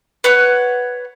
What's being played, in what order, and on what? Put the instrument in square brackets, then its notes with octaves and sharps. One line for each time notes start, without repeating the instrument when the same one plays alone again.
[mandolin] B4 C#5 F#5